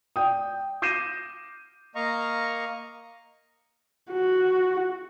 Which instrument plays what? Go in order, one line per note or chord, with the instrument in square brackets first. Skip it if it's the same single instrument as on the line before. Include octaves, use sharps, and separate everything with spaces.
[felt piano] D5 G5 D#6
D6 G6 A#6 C7 D#7 E7
[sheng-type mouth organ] A#3 D#5 F5 A#5 C#6
[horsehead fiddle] F#4